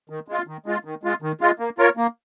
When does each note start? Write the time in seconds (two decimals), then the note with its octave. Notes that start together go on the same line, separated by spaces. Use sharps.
0.10 D#3
0.28 G#3 F4
0.47 D#3
0.66 G#3 F4
0.85 D#3
1.03 G#3 F4
1.22 D#3
1.41 G#3 F4
1.59 A#3
1.78 F4 A#4 C#5
1.97 A#3